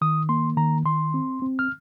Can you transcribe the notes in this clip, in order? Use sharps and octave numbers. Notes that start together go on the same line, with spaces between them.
D#3 D#6
A#3 C6
D#3 A#5
D#3 C6
C4
C4
F6